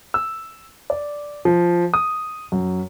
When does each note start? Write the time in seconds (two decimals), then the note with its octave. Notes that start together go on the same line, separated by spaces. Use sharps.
0.14 E6
0.90 D5
1.45 F3
1.94 D#6
2.52 F#2